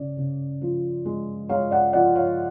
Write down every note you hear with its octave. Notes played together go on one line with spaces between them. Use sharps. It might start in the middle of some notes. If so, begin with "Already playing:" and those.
Already playing: C#3 D5
C#3
F3
G#3
G#3 C#5 F5
D5 F#5
F3 D5 F#5
C#5 F5